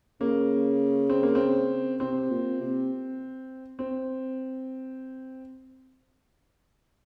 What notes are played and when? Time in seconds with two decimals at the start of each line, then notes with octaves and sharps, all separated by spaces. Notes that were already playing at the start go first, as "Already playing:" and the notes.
0.21 C#3 A#3
1.10 C4
1.23 A#3
1.35 C4
2.00 C3 C4
2.30 A#2
2.60 C3
3.79 C4